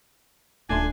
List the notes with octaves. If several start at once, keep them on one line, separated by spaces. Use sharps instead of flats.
D1 A#2 A3 D4 D#4 G#5 C6